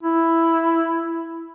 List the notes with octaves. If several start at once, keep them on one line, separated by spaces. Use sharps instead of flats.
E4